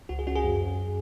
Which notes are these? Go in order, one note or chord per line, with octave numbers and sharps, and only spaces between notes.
C#2 F#4
G#4
C#4 F#4
G#4
F#2
F#2